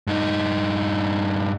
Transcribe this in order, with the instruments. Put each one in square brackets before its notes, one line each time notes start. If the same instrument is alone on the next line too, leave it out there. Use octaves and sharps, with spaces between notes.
[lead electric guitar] G2 D#4